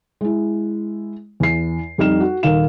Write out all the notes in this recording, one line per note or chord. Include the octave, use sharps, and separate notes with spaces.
G#3 E4
E2 C7
F2 G3 D#4 F6 E7
F#4
D#1 D#3 A#4 F5 E7